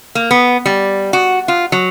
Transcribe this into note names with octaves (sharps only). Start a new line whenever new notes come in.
A#3
B3
G3
F#4
F4
F#3